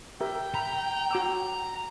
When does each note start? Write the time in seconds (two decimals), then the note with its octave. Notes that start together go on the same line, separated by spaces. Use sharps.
0.21 G4 A#4 E5 G5
0.54 A#5 B5
1.11 F#4 D6 E6